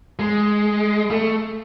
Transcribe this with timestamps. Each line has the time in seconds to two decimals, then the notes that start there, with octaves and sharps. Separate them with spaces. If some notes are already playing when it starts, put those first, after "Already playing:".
0.19 G#3
1.11 A3